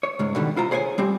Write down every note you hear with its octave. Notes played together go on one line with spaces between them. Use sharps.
C#5
C#2 G#2 G#3
B2 D3 D#3 G3
E4 F4 C5 A#5
G#4 C5 C#5 F#5 G#5
G3 C4 G4